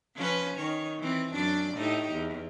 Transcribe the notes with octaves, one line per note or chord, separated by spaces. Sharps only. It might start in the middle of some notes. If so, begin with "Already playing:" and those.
F3 C#4 B4
D#3 C#5
E3 C4
F#2 D4 D5
A2 D#4 G4
E2